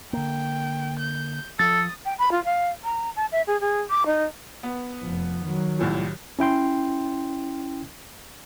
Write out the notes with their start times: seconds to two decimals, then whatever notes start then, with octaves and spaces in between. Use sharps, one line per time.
0.13 D3 A#3 G5
0.99 G6
1.59 F3 A4 D#6 A6
2.05 G5
2.18 B5
2.31 F4
2.44 F5
2.84 A#5
3.16 A5
3.32 E5
3.47 G#4
3.60 G#4
3.90 D6
4.06 D#4
4.63 B3
5.02 F1 F3
5.44 D#3 F#3
5.79 C2 A2 F3
6.39 C#4 E4 G5 C6